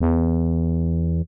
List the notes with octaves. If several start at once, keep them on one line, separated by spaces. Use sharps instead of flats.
E2